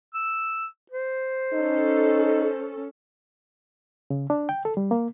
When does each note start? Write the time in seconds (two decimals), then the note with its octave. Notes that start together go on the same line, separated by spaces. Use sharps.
0.14 E6
0.92 C5
1.53 C#4 D#4 A4
4.10 C#3
4.30 D4
4.49 G5
4.65 A4
4.77 G3
4.91 A#3